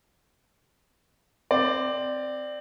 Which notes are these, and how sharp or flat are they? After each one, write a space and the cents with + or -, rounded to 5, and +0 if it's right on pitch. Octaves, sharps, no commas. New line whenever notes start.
C4 -5 D5 +10